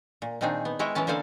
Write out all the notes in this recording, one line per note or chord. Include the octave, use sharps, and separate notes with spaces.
A#2
A#2 D#3 C4 D4 D#4 G#4
B3
G#3 E4 C#5 D#5 G5
E3 F#3 B3 C#4 A5
D3 A#3 A4 C5 D5 G#5